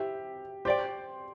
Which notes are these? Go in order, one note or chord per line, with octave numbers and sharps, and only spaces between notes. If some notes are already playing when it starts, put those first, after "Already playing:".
Already playing: E4 G4 C5 E5
G4 C5 D5 G5